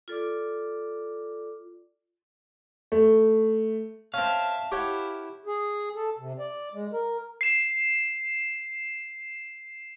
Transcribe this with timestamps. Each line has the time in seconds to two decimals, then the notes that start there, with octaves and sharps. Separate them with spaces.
0.08 F4 A4 D5 D6
2.92 A3
4.14 C4 C#4 E5 F5 A5
4.72 E4 G4 C#5 F#5
5.46 G#4
5.96 A4
6.18 C3
6.39 D5
6.74 G#3
6.93 A#4
7.41 C7 E7